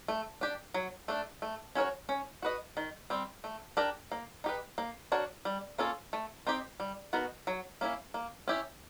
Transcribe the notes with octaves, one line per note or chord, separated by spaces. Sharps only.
A3
D4 G4
F#3
A3 D4
A3
C#4 F#4 A#4 C#5
C#4
F#4 B4 D#5
D#3
G3 C4
A3
D4 G4 A#4
A#3
D#4 G4 B4
A#3
D4 F#4 A#4 C#5
G3
A#3 C#4 F4 A4
A3
C4 D#4 G4
G3
B3 D#4 F#4 A#4
F#3
A#3 C#4 E4
A#3
C#4 E4 G4